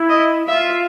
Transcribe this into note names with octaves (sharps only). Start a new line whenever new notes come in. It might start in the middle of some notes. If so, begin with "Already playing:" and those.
Already playing: E4
D#5
F4 E5